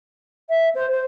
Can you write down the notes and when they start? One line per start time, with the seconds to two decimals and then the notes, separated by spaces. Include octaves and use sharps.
0.49 E5
0.75 C5
0.91 C5